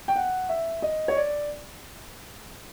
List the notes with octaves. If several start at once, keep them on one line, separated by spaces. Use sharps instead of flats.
G5
F#5
E5
D#5
C#5
D5